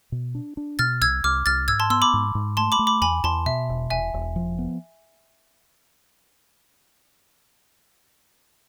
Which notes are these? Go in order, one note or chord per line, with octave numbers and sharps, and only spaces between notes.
B2
D4
D4
B2 F6 A6
C2 E6 G#6
C2 D6 F6
C2 F6 A6
G#2 E6 G#6
A5 C6
B3 C6 E6
B5 D6
G#2
G#2
A3 A5 C6
B5 D6
A3
B5 D6
E2 G#5 B5
E2 A5 C6
B2 E5
E1
E1 E5 G#5
E1
F3
B3